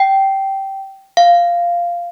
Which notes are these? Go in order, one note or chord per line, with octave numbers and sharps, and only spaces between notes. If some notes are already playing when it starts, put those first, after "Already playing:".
Already playing: G5
F5